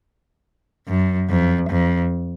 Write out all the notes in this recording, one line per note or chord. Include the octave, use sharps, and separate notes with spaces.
F#2
F2
F2